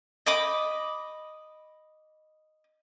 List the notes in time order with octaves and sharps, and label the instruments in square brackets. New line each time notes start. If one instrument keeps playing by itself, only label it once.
[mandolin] D#5 B5 D6 D#6